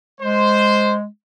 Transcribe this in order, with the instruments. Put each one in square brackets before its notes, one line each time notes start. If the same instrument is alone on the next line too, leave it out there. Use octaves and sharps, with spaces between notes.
[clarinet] G#3 [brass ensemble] C5